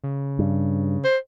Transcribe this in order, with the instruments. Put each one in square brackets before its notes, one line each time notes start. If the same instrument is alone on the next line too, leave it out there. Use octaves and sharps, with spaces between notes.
[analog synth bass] C#3
[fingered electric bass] G2
[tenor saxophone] C5